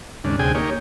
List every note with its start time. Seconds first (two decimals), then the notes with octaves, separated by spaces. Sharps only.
0.24 D#2 G#2 C#3 D4
0.39 D2 C3 G#4 G5 G#5
0.55 A#3 D#4 G4 C#5